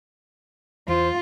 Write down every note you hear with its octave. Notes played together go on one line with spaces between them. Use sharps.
E2 F4 C5